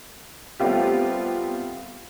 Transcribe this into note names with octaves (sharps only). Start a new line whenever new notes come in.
G3 A3 B3 C4 F4 G4